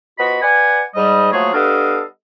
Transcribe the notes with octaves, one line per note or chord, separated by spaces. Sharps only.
F3 B3 F#4 D#5 B5
B4 D5 F#5 G#5
G#2 G3 D#5
F3 F#3 A3 A#3 G#4 C#5
G3 B3 D4 A4 D#5 F5